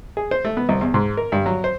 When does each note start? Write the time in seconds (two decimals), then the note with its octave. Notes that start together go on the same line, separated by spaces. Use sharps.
0.17 G#4
0.31 C5
0.45 A3
0.57 B3
0.69 C2
0.81 E2
0.94 G#2
1.17 A#4
1.32 G2
1.46 F#3
1.64 C5